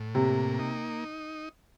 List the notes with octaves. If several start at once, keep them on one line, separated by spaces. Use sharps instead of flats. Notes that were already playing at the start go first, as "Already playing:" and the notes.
Already playing: A2
C3 A#3
D#4